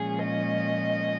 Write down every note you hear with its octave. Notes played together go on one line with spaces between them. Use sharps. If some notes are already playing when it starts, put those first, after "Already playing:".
Already playing: A#2 F3 G#3 C#4 G#4
D#5